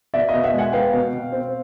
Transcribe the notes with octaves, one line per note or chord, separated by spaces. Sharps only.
B2 D5 E5
B2 D#5 F5
E5 F#5
G#3 F#5 G#5
B3 F5 G5
B2
B2
C4